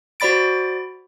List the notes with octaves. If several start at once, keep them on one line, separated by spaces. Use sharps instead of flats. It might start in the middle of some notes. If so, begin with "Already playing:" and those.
F#4 C5 D5 B5 A6 D7